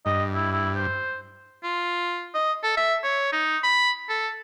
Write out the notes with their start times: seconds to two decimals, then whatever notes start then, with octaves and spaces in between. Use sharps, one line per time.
0.06 G2 D#5
0.35 E4
0.53 E4
0.76 C5
1.64 F4
2.35 D#5
2.63 A4
2.77 E5
3.04 C#5
3.33 D#4
3.64 B5
4.09 A4